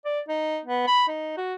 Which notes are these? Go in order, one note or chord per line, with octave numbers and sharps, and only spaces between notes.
D5
D#4
B3
B5
D#4
F#4